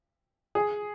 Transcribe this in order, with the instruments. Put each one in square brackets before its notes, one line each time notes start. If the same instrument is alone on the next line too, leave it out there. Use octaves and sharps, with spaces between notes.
[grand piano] G#4